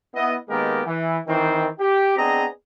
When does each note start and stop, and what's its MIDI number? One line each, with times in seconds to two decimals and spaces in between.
0.14 0.36 59
0.14 0.36 64
0.14 0.36 75
0.49 0.81 51
0.49 0.81 56
0.49 0.81 58
0.49 0.81 59
0.49 0.81 67
0.49 0.81 70
0.86 1.17 52
1.28 1.67 51
1.28 1.67 52
1.28 1.67 60
1.79 2.15 67
2.17 2.46 59
2.17 2.46 60
2.17 2.46 62
2.17 2.46 68
2.17 2.46 75
2.17 2.46 82